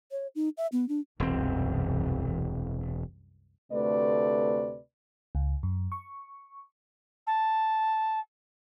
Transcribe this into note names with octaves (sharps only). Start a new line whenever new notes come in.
C#5
D#4
E5
B3
D4
E1 C2 F#2 E3 C4
D2 C3 A3 B4 D5
C#2
F#2
C#6
A5